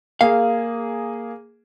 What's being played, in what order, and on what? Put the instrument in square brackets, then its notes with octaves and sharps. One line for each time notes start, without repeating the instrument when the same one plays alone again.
[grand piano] A#3 G#4 [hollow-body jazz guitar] F5